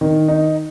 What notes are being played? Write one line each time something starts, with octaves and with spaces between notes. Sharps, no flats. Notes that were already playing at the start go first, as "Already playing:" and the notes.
D#3
D#4